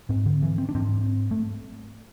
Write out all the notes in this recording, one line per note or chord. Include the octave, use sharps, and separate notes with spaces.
G#2 C4
D3
E3
C4
D4
G#2 C4
A3